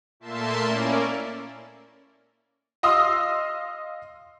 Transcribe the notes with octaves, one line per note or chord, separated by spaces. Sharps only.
A#2 A3 A#3 E5 A5 C6
A#3 C#4 E4 A#4 D5
D#5 F5 C6 D#6 E6